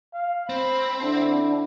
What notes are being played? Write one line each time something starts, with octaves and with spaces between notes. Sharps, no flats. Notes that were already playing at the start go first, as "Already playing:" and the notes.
F5
C4 C5 B5
D3 D4 E4